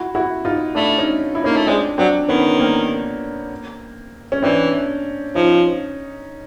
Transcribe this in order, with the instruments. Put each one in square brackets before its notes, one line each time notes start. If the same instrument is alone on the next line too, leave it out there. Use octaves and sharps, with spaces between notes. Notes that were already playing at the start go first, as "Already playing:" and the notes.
Already playing: [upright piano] E4 F#4
E4 F#4
D#4 F4
[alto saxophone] A3 [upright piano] D4 E4
[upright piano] C#4 D#4
E4
[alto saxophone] A#3 [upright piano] C#4 D#4
[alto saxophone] A3
[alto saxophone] G#3 [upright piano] C4 D4
[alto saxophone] F#3 [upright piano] C4 D4
[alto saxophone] D#3 [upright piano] B3 C#4
[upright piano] A#3 C4
C#4
[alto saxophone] E3 [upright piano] C4 D4
[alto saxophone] F3 [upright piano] C#4 D#4